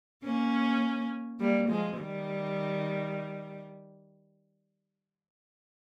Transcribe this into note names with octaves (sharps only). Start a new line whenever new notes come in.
A#3 C#4
G3 A#3
F3 G#3
D#3 G3